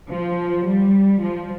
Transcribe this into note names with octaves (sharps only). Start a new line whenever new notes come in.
F3
G3
F3